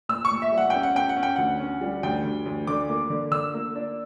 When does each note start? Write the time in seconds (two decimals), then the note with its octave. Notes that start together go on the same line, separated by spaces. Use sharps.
0.09 A#2 E6
0.25 C#6
0.31 A#2
0.42 E5
0.52 G3
0.58 F#5
0.70 C#4 G5
0.83 F#5
0.95 C#4 G5
1.09 F#5
1.17 C#4
1.23 G5
1.36 D2 F#5
1.60 C#4
1.81 G3
2.03 D2 G5
2.25 D2
2.46 D2
2.67 D3 D6
2.89 A#3
3.10 D3
3.32 D3 E6
3.54 A#3
3.75 D4